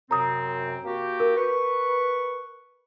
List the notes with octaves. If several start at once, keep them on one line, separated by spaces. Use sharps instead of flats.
F#2 C3 C4 A#5 D#6
A#3 F#4 G4
A#4
B4 C#6